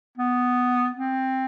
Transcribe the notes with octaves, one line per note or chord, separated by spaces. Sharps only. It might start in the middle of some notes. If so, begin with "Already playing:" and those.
B3
C4